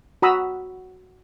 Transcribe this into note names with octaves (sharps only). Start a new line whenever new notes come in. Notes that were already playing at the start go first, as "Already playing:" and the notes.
F#4 A#5 B5 D#6 E6